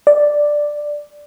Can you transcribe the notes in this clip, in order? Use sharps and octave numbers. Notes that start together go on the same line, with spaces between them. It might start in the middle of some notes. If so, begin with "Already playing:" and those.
D5